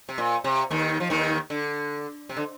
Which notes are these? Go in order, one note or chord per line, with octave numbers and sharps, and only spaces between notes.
C3
A#2
C3
D#2 D#3
F3
D#2 D#3
D3
C3
D3